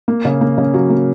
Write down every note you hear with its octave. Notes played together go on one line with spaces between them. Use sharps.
A#3
C#3
A#3
C#3
F#3
A#3